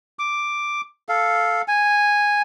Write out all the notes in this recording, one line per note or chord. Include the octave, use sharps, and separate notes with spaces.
D6
A4 F5
G#5